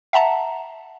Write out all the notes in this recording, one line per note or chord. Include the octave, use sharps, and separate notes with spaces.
E5 F#5 A5 A#5